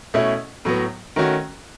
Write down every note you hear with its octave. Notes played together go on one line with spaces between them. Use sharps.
B2 A3 C#4 E4
A2 F#3 B3
D#3 A3 C#4 F#4